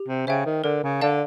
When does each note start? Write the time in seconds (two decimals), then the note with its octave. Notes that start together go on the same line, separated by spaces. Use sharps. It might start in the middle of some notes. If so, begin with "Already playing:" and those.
Already playing: G4
0.08 C3
0.27 C#3 C5 E5 G5
0.46 D#3
0.64 D3 A#4
0.83 C#3
1.01 D3 D5 F5 A5